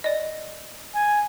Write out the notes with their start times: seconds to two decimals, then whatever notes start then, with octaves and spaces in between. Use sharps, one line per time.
0.04 D5 D#5
0.94 G#5